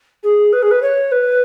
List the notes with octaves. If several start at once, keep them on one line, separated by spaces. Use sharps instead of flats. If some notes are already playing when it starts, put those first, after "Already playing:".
G#4
B4
G#4
B4
C#5
B4